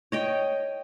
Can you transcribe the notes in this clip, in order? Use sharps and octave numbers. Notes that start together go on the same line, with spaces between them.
C#5 D#5 G5